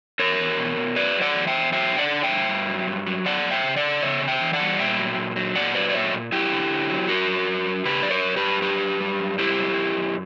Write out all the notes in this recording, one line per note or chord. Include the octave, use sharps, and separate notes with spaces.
E2 A#4 C#5
E2
B2
B2
F#3 B4 D5
F#3
D5 F#5
E2
E5 G5
E2
F#3 E5 G5
D3
D5 F#5
D3
E5 G5
G2
G2
F#3
G2
F#3
F#2 D5 F#5
F#2
E5 G5
C#3
D5 F#5
C#3
C#3 C#5 E5
C#3
E5 G5
E3
D5 F#5
G3
A#2 E5 G5
F#3
A#2
F#3
A#2 D5 F#5
F#3 B4 D5
D5
A#2 C#5 E5
A#2
F#2 E4 G4
D3
D3
F#3
F#2 F#4 A#4
F#2
F#2
F#2
C#3 G4 B4
F#2 D5
A#4 C#5
F#2
G4 B4
F#2
F#2 G4 B4
F#2
G3
F#2
G3 E4 G4
F#2
F#2
F#2